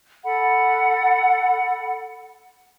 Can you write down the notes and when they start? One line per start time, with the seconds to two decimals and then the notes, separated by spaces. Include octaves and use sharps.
0.24 A4 F#5 B5